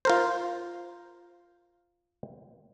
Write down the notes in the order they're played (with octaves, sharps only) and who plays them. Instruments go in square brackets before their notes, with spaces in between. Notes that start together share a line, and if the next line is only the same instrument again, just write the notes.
[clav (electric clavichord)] F4 A#4 C5